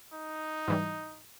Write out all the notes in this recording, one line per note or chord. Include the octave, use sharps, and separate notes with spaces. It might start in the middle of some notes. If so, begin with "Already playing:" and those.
D#4
G#2 E3 G3